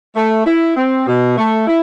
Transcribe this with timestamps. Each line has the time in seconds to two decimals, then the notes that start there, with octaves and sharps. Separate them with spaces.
0.16 A3
0.46 E4
0.77 C4
1.07 B2
1.37 A3
1.67 E4